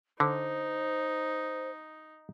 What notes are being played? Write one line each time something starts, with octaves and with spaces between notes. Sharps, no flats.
D3 D#4 C5